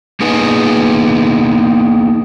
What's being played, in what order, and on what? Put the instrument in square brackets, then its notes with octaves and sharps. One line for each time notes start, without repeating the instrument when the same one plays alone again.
[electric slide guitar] A#3 B3 D#4 G#4 B4 G#5